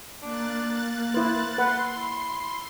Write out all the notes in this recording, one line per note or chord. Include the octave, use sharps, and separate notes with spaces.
A#3 D4 F#6 A6
E4 B4 C5
E4 B4 F#5 C6
E4